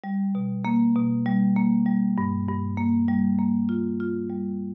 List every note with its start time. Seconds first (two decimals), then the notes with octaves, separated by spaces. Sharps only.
0.04 G3
0.35 B2
0.65 A#3
0.96 B2
1.26 G3
1.56 A#3
1.86 G3
2.18 G2
2.48 G2
2.78 A#3
3.08 G3
3.39 A#3
3.69 F4
4.00 F4
4.30 G3